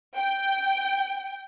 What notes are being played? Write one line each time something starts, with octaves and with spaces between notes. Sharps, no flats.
G5